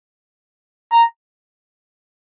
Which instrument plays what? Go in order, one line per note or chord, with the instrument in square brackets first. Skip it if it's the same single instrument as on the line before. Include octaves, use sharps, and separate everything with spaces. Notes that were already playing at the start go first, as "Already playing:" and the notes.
[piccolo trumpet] A#5